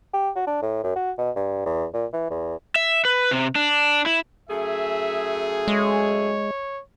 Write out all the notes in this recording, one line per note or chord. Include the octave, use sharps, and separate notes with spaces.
G4
F#4
D4
A2
F#2
F#4
B2
G2
E2
A#2
E3
E2
E5
B4
C3
D4
E4
F#2 A3 G#4 E5
G#3 C#5